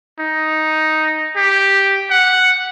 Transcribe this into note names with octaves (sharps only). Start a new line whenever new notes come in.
D#4
G4
F#5